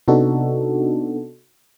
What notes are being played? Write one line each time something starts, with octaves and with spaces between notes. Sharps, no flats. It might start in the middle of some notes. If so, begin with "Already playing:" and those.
C3 B3 D4 D#4 F#4 A4